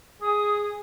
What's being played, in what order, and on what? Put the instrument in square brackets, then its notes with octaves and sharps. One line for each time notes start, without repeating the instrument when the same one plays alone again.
[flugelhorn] G#4 [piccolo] D#6